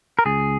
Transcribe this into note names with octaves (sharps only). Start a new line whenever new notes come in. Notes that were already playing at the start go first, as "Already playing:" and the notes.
A#4
C#2 G#4